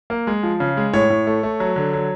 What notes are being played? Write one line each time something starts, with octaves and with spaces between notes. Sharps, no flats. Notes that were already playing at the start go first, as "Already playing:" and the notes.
A#3
G#3
F3
C#3
G#3
A2 C#5
A2
A3
A3
F#3
D3
F#3